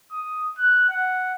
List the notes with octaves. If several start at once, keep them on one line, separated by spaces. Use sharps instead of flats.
D#6
F#6
F#5